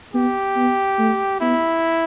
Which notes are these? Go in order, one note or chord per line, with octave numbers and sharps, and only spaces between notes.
B3 G4
B3
A3
B3 E4